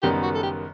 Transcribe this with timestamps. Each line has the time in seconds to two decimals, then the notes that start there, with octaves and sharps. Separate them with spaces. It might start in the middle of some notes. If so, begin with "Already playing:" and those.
0.03 F#1 F#2 D#3 G3 B3 G4
0.23 F#4
0.35 A4
0.43 G4